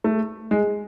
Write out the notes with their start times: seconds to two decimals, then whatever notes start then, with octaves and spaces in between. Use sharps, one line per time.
0.04 A3
0.51 G#3